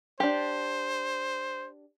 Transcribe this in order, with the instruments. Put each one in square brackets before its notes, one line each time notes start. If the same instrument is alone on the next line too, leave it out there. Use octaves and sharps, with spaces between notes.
[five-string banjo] D4 G4 [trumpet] C5